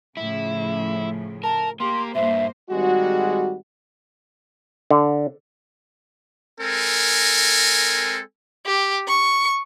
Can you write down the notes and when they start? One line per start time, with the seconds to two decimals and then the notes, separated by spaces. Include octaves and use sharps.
0.17 A2 C#3 F3 E4
1.44 A#4 A5
1.80 A#3 G4 C6
2.15 G2 A#2 A#3 C5 E5
2.70 G#1 G3 G#3 F#4
4.91 D3
6.61 G#3 C4 A4 A#4 G#5
8.66 G4
9.08 C#6